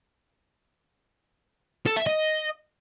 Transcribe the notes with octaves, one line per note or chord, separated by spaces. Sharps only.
A4
E5
D#5